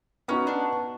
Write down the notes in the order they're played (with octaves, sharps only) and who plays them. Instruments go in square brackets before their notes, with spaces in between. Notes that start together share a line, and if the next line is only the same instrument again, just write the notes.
[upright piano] B3 D#4 F#4 [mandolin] C#4
[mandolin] D4